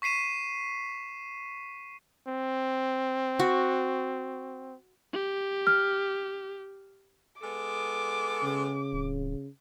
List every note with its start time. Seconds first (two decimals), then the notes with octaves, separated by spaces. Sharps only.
0.02 C#6 B6 C7 D#7 E7
2.28 C4
3.39 F#4
5.13 G4
5.67 F6
7.42 G#3 B3 A4 D6
8.43 C#3
8.93 D1